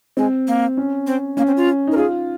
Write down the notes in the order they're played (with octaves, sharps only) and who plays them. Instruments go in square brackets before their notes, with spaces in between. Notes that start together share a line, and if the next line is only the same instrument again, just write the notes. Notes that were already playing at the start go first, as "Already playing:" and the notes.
[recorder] G#3 [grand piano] C4
[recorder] A#3
[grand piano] C#4
[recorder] C4
[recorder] A#3 [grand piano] C#4
[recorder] C4
F4
[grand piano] D#4
[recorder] A#4
[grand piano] F4 [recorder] G#4